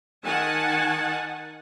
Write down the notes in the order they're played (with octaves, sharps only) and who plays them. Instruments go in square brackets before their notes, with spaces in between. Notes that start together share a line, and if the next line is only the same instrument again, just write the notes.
[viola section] D#3 F#5 G#5 A5